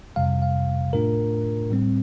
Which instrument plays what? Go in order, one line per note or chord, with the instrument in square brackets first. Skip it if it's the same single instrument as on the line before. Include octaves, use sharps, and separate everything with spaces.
[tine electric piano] F2 C3 G3 F5
F5
A2 A3 D4 F4 A#4
A2 G3 C4